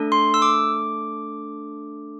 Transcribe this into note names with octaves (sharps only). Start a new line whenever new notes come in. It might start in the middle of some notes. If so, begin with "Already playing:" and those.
Already playing: A3 D4 A4
C6
E6
D6